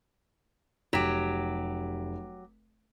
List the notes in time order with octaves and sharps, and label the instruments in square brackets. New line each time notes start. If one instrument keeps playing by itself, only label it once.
[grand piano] F1 B6 E7 [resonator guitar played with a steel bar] F#3 G4